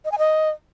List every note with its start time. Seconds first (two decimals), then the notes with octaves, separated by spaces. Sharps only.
0.05 D#5
0.12 G#5
0.18 D#5